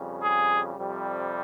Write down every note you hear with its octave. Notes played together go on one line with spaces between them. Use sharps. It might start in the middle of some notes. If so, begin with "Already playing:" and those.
Already playing: F2 C#3 G3
G#4
F2 C3 G3